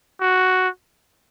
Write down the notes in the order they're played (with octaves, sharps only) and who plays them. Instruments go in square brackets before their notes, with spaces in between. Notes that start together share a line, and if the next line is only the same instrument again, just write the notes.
[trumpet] F#4